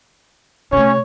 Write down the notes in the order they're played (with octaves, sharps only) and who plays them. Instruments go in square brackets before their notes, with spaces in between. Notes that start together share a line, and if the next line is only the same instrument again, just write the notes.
[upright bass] C3 A3 [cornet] C#4 [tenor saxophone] C#5